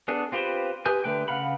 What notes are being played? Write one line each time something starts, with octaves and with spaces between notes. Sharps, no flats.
B3 D4 G#4 A4
C4 F4 G4 B4 C5
G4 B4 G#5 D#6 G6
D3 A3 B4 G5
C#3 F5 F#5 B5